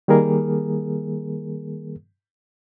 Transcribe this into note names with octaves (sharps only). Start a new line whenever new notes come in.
D#3 G3 A#3 G#4 A#4